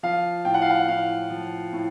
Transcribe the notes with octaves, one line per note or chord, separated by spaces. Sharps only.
F3 F5
A2 G5
F#5
F5
F#5
A2 F5
F3
A2